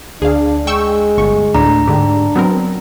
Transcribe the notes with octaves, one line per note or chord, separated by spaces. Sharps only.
D2 D4 G#4 F5
G#3 G5 C#6 E6
G1 C#6
D2 A2 D4 A#5
G#2 D3 D4 G4
F#3 B3 C4 A#4